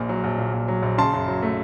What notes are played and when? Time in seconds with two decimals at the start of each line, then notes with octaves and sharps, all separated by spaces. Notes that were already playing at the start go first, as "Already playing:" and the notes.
Already playing: A#1 A#2
0.09 F#3
0.24 A#1
0.38 A#2
0.53 A#1
0.68 F#3
0.82 A#1
0.98 C#3 A5 C6
1.13 F#2
1.28 F#3
1.42 A3